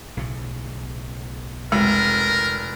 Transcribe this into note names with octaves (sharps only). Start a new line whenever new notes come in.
B1 A2 C#3
F1 G#3 A#4